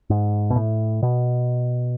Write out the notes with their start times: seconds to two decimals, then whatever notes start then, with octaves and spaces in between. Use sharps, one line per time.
0.10 G#2
0.50 B2
0.56 A2
1.03 B2